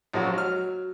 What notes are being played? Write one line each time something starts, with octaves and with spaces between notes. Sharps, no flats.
A#1 F#2 F#3 F#4
F#3 F6